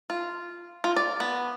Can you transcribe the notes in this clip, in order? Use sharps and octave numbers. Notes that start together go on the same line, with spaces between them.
F4
F4
D5
B3